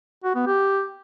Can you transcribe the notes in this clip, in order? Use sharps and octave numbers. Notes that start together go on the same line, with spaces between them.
F#4
B3
G4